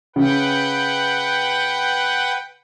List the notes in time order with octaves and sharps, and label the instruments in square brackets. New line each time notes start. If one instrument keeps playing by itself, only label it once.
[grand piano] C#3 [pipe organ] B4 F#5 G5